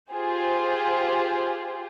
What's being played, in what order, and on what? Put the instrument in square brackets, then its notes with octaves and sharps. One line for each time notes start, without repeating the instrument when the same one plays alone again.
[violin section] F4 G4 G#4 C5